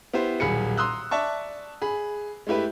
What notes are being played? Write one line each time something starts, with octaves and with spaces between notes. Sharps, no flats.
B3 E4 G4 C5
D#1 B1 G#4 B5 C#7
A#5 C6 D#6 E6 F#6
D5 E5 A5 C#6
G#4 B5
G#3 A3 E4 G4 B4